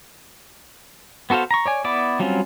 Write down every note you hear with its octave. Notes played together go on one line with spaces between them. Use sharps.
B3 F#4 A4 C5 F5
A#5 C#6
C#5 D5 G#5
B3 E4 D5 D6
F#3 G3 C4 C#4 F4